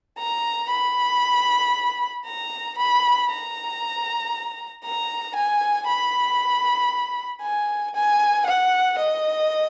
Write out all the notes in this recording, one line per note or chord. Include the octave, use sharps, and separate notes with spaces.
A#5
B5
A#5
B5
A#5
A#5
G#5
B5
G#5
G#5
F#5
D#5